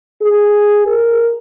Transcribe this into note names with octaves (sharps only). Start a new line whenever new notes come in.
G#4
A#4